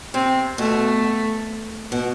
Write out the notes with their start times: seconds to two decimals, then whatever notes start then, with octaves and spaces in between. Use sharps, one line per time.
0.14 C3 C4
0.58 B2 A3
1.92 B2